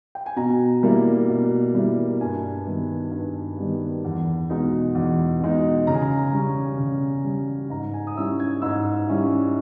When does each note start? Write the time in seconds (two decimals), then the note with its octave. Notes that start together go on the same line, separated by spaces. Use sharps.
0.15 G5
0.26 G#5
0.36 B2 A#5
0.83 G3 A#3 E4
1.28 B2
1.75 G3 A#3 E4
2.21 G2 G#5
2.67 D#3 G3 B3
3.12 G2
3.57 D#3 G3 B3
4.04 E2
4.50 B2 G#3 D#4
4.95 E2
5.41 B2 G#3 D#4
5.87 C#3 A#5
5.94 G#5
6.02 A#5
6.33 G3 C#4
6.78 C#3
7.25 G3 C#4
7.70 G#2 A#5
7.94 G#5
8.07 D#6
8.16 G3 C#4 E4 E6
8.40 G#6
8.62 G#2 E6
9.08 G3 C#4 E4